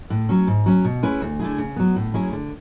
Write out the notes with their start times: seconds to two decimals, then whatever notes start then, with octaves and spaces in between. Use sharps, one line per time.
0.10 A2
0.29 F#3 C#4
0.47 G#2
0.66 F#3 C#4
0.85 B2
1.03 G#3 C#4 E4 B4
1.22 D2
1.40 D3 A3 E4 G#4
1.58 C#3
1.76 F#3 B3
1.96 A2
2.14 F#3 C#4 E4 G#4
2.32 D3